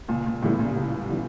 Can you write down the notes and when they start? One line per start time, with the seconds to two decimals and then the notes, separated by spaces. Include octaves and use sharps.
0.08 C#2 A#2
0.26 A#2
0.42 A2 C#3 E3 G3 B3
0.60 A#2
0.76 C#2
1.10 C#3 E3 G3 B3